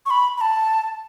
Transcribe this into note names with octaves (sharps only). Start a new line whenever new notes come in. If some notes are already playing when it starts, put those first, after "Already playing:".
C#6
B5
B5
A5